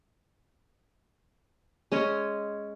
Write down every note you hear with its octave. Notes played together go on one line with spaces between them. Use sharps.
G#3 C#4 C#5 D#5